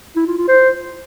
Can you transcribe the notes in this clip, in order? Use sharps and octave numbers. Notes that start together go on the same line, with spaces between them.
E4
F4
F4
C5